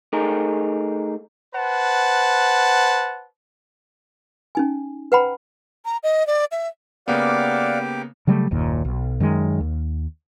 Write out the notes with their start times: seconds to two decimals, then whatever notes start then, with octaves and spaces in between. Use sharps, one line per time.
0.13 A3 D#4 G#4 A#4
1.55 B4 C5 F#5 A5
4.55 C#4 D#4 G#5
5.12 B4 C5 F#5 G5 A#5 B5
5.85 A#5
6.03 D#5
6.27 D5
6.52 E5
7.08 C#3 A#3 B3 G4 D5 F5 F#5 D6
8.27 C#3 F#3 G3 A3
8.51 F#1 D#2 A#2
8.85 B1
9.20 F#2 D#3 E3 G#3
9.60 D#2